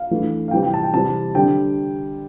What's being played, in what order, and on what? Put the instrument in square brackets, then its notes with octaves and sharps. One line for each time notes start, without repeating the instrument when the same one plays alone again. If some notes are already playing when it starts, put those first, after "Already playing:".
Already playing: [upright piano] F5
E3 A3 D4
F5
C3 E3 G3 C4 G5
G5
A5
G5
C3 E3 G3 C4 A5
D3 G3 C4 G5